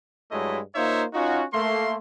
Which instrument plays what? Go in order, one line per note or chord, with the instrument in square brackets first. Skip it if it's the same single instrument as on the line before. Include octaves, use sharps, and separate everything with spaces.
[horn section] G2 F#3 G#3 A3 E4 D#5
A#3 D#4 F4 C5 C#5 E5
C#4 D#4 F4 F#4
A3 A#3 C6